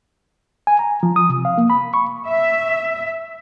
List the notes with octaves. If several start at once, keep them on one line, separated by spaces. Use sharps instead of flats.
G#5
A#5
F3
D#6
C3
F5
A#3
B5
C#6
E5